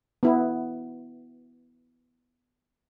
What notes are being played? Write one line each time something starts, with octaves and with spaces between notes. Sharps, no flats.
B3 E4